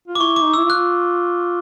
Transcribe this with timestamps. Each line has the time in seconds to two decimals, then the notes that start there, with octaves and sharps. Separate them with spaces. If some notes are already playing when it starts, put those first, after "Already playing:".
0.08 F4
0.15 D6
0.20 E4 C#6
0.36 D6
0.43 D#4
0.54 E4 E6
0.65 F4
0.70 F#6